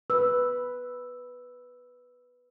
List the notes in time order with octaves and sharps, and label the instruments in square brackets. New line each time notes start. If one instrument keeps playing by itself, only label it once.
[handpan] B4 [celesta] E6